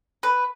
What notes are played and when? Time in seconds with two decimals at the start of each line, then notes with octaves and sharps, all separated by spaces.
0.23 B4